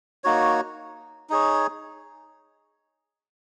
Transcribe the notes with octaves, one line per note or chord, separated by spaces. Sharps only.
A#3 D#4 F#4 C#5
D#4 G#4 C#5